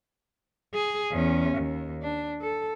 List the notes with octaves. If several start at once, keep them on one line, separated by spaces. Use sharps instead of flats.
G#4
E2 C#4
D#2
D4
A4